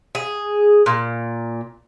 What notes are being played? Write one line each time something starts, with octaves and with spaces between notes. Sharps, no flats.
G#4
A#2